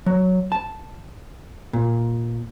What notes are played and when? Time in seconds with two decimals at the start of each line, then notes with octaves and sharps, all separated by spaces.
0.06 F#3
0.52 A5
1.73 A#2